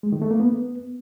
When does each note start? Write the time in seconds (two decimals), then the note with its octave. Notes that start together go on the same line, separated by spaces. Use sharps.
0.03 G#3
0.12 D#3
0.22 A3
0.31 A#3
0.40 B3